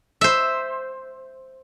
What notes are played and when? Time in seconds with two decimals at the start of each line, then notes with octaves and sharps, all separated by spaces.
0.21 C5 E5